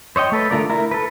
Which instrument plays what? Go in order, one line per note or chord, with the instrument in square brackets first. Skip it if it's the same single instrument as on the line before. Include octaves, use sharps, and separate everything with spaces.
[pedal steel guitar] C5 C#5 D#5 G5
A3 A4 B4
D3 A3 F4 A#4 D5
E4 A#4
A4 B4